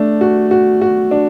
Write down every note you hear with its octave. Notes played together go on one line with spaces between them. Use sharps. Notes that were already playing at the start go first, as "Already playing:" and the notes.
Already playing: A3 D4
F#4
F#4
F#4
D4